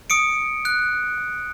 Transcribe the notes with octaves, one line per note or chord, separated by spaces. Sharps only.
D#6 C#7 D7
F#6